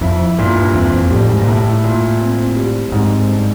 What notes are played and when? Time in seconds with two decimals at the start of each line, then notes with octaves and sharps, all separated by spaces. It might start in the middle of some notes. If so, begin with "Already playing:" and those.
0.01 F2 E4
0.38 G2 A#2
0.56 G2
0.74 E2 C4
0.93 F2
1.10 A2 G3
1.29 G#2
1.42 A#2
1.48 A2 E4
1.84 A#2
2.20 C4
2.56 G3
2.92 G#2 C4
3.29 G2